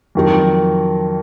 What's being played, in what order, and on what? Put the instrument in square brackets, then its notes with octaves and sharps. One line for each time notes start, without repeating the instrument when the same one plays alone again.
[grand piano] F2 D#3 F#3